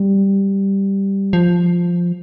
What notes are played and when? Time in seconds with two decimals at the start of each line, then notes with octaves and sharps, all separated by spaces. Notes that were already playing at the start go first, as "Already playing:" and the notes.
Already playing: G3
1.33 F3